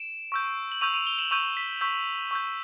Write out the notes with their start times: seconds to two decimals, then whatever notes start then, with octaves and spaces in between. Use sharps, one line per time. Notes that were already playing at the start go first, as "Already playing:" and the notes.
Already playing: D7 E7
0.32 C#6 E6 G6
0.72 F#7
0.81 C#6 E6 G6 D#7 F7
0.94 D#7 F7
1.07 F7 G7
1.19 E7 F#7
1.31 C#6 E6 G6 D#7 F7
1.57 B6
1.81 C#6 E6 G6 B6
2.31 C#6 E6 G6